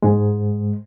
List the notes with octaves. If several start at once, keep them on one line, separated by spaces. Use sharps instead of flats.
G#2 G#3